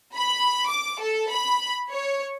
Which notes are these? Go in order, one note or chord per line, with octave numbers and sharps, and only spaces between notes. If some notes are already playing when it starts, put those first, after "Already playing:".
B5
D6
A4
B5
C#5